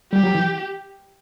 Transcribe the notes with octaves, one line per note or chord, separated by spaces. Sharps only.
G3 G4
F#3
E3